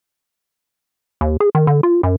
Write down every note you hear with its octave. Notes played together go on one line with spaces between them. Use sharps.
D#2
G#4
D#3
D3
F4
F#2